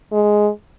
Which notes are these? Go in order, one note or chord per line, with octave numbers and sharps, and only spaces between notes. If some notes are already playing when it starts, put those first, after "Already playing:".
G#3